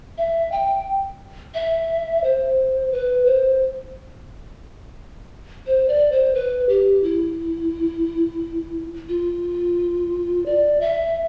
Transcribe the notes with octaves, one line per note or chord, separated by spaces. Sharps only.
E5
G5
E5
C5
B4
C5
C5
D5
C5
B4
G4
E4
F4
D5
E5